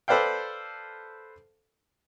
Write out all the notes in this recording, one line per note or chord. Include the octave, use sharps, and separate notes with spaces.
A4 B4 C5 D5 F5 G5